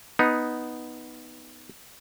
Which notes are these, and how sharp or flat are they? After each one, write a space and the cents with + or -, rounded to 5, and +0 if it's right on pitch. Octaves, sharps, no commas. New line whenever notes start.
B3 +0 D#4 +0